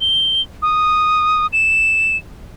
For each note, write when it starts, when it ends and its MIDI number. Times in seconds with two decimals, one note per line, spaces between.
0.01 0.42 103
0.62 1.47 87
1.53 2.17 100